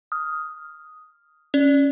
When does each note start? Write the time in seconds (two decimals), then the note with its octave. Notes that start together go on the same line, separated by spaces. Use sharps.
0.12 D#6 F6
1.54 C#4 D5